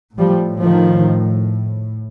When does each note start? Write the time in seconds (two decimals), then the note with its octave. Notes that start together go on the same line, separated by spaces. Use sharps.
0.18 A2 F3 G3
0.63 D#3 F3